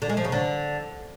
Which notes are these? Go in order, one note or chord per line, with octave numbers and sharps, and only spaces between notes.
D3
G#3
F3
C#3
D3